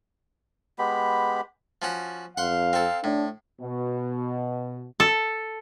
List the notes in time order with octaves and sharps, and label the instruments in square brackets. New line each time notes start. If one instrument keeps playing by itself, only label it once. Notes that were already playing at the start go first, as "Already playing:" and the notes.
[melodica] G#3 B3 G4 B5
[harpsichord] F3 C#4 F#4
[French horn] F2 [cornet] F5 [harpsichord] F#5 C6
[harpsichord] C4 A4
[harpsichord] A2 [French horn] D4
[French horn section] B2
[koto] A4